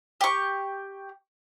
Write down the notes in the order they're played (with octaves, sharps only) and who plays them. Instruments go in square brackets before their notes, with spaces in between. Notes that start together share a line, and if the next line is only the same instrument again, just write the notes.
[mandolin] G4 C#6